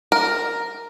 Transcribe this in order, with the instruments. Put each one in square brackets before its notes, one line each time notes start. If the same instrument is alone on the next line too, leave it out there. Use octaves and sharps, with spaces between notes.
[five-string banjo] A#4